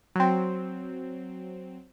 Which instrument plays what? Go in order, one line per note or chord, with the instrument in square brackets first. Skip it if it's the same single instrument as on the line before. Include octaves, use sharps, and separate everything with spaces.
[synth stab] F#3 C4